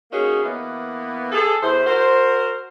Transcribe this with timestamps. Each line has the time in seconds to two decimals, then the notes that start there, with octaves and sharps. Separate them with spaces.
0.11 A#3 C#4 D#4 F#4 G#4
0.43 E3 A#3 B3
1.32 G#4 A4
1.62 E2 E4 C5
1.85 F#4 A#4 C5